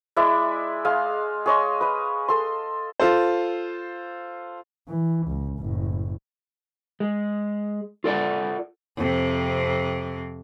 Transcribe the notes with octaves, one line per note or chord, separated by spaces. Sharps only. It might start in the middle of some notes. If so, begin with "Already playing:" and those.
G#3 E4 D5 E5
G#3 F5
G#4 C#5 D#5 C6
B4 D#5
A4 C6
F4 A4 C5
E3
C#2
F#1 A2
G#3
F4 A4 D5 F#5
F2 C3